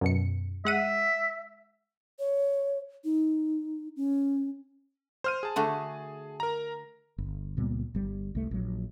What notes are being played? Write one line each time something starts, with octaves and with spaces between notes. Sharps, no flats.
F#2 B2 C#7
G#3 E5 F#5 D#7
C#5
D#4
C#4
C5 F6 D#7
G#4 A5
D3 A3 F#4
A#4 A#5
G1
C#2 A#2 G3 B3
G1 G3
C2 A3
A#1 F#3